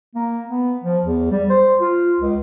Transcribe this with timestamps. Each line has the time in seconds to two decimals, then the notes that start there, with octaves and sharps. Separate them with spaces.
0.15 A#3
0.48 B3
0.84 F3
1.06 E2
1.31 G3
1.50 C5
1.81 F4
2.20 C#2